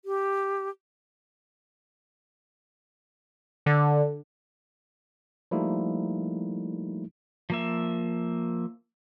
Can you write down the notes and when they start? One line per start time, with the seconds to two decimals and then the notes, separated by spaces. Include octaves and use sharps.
0.05 G4
3.66 D3
5.51 F3 G3 A3 A#3 D#4 E4
7.50 F3 A#3 E5